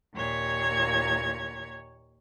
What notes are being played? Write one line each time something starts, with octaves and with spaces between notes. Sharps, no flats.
D#2 A#2 C#5 G#6